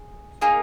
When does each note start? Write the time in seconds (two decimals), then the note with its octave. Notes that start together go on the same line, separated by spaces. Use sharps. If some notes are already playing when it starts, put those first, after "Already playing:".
Already playing: G#4
0.41 A#3 D#4 G#4